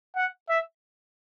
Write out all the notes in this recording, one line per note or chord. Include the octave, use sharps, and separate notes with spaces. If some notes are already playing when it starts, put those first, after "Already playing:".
F#5
E5